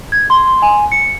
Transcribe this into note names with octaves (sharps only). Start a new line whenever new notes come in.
G#6
C6
G#5
C#7